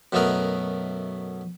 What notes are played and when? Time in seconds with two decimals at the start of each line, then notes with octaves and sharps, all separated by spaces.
0.12 F#2 B2 A3 B3 A#4 D#5